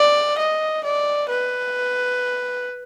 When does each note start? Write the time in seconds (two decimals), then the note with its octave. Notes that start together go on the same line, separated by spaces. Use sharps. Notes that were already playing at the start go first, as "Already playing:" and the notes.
Already playing: D5
0.38 D#5
0.84 D5
1.29 B4